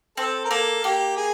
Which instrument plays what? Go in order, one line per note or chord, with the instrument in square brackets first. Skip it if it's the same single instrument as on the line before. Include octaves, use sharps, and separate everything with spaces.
[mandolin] C4 [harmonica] A4
[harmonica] A#4
[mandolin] A#3 [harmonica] A4
[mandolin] A#3 [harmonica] G4
[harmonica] G#4